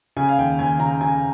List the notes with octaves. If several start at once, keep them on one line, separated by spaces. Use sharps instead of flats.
C#3 G#5
F5
D#2 G5
D#2 G#5
C#3 A#5
C#3 G#5